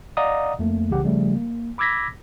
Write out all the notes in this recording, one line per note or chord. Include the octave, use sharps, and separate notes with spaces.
D5 D#5 F5 F#5 A#5 D#6
F2 A3 A#3
C2 C#3 E3 G4 F#5
C#3 F3 G3 A3
A#3
B5 D6 E6 G#6 A#6 B6